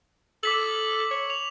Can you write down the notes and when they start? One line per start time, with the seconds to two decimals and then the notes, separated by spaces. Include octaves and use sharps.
0.43 A4 D6 B6 F#7
1.11 C#5
1.30 F7